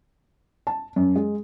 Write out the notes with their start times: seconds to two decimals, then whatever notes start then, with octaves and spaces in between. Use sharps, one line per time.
0.67 A5
0.96 F#2
1.16 G#3